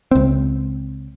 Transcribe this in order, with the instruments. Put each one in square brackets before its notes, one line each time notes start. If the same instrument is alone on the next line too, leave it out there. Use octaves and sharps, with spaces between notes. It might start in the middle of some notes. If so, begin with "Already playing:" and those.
[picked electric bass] C#2 C4